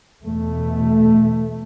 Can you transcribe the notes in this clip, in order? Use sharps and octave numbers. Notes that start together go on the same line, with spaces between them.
E2 B2 A3